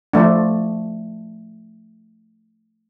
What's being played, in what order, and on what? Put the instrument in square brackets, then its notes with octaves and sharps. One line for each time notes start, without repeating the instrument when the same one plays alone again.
[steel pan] F3 A3 D4